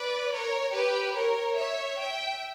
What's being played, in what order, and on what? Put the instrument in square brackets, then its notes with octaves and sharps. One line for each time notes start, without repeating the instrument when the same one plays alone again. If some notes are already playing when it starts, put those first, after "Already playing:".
Already playing: [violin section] B4 D5
A#4 C#5
G4 B4
A#4 C#5
C#5 E5
E5 G5